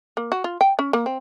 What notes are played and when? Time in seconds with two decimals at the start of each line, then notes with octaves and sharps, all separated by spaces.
0.17 A#3
0.32 F#4
0.44 F4
0.61 G5
0.79 C#4
0.93 A#3
1.06 C4